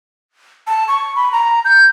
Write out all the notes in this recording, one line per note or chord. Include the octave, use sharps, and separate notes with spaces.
A5
C#6
B5
A#5
G6